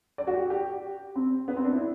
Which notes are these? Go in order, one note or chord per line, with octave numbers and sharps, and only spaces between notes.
D5
F#4
G4
G4
C4
B3
C4
D4
E4